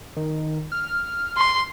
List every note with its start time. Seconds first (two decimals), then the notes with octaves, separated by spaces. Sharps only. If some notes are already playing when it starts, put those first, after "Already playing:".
0.16 D#3
0.72 F6
1.37 C6